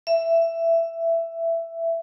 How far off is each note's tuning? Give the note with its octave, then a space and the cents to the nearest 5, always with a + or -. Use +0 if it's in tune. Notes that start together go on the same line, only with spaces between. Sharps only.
E5 +15